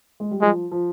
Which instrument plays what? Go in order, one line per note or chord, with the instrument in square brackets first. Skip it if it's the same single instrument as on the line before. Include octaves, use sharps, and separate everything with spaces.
[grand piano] G#3
G3
[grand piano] F3 [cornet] G#3
[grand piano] F3